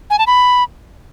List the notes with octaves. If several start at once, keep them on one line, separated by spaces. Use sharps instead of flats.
G#5
A5
B5